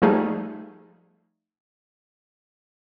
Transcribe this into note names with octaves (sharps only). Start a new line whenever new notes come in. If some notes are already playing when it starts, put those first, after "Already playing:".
F3 G3 A3 D#4 G#4 F5